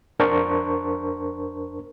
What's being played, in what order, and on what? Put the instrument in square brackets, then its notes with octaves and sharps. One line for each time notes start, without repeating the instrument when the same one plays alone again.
[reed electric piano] F2 D4 A#4 C5 A5 C#6